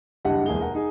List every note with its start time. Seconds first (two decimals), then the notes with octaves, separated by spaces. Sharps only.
0.25 F#1 G2 D4 G4 D#5 F#5
0.46 E1 A#3 B3 G#4 G7
0.60 A#4 F#5
0.75 D#4 G#4